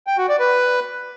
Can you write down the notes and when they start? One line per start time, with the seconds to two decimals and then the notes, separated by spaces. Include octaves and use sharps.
0.07 G5
0.18 F#4
0.29 D5
0.40 B4